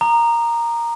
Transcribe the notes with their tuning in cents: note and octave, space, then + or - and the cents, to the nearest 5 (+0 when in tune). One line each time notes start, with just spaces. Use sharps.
A#5 +0 D#6 -40